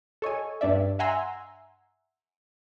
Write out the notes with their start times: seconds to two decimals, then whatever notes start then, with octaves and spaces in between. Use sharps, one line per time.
0.22 A4 C#5 D#5 G#5
0.61 G2 D4 D5 E5
0.99 E5 F#5 G#5 A#5 C6 E6